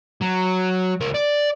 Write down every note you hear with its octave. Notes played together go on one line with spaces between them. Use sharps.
F#3
C#2 A#4
D5